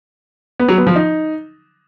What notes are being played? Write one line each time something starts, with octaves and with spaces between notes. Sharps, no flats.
B3
F#3
B3
F3
D#4